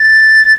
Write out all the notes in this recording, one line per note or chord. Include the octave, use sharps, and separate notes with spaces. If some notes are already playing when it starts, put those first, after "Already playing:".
Already playing: A6